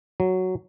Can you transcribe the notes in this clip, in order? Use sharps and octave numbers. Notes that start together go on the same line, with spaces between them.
F#3